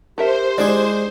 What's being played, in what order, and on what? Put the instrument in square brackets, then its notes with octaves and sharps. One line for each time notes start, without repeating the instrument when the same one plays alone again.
[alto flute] G4 [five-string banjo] A4 A#4 E5 [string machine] C5
[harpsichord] G#3 D4 G#4 [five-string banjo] E4 D5